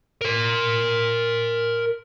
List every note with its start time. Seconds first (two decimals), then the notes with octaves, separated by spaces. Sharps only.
0.22 A#4 C6